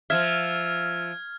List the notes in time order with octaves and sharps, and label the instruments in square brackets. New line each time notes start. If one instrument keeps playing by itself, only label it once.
[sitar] F3 E5 [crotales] F6 G#6